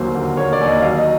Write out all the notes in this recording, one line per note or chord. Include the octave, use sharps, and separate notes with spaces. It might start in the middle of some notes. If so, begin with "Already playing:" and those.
Already playing: D#2 D3 F#3 A#3 C5
D3
A#3 C#5
D5
D#2
D#5
F#3 F5
D#5